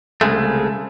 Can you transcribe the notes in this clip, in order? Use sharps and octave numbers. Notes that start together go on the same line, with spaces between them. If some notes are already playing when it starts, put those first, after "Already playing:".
C2 C#3 G#3 A3